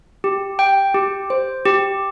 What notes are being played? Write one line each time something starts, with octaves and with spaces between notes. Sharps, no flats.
G4
G5
G4
C5
G4